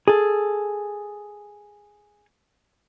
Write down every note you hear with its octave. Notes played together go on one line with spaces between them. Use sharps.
G#4 A4